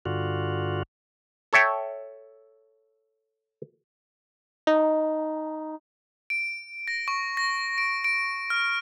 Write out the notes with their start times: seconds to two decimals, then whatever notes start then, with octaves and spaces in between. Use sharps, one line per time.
0.06 G2 D3 F4 F#4
1.53 A4 C#5 E5 G5
4.67 D#4
6.30 D7
6.88 A#6
7.08 C#6
7.37 A#6
7.78 D7
8.04 D7
8.50 F6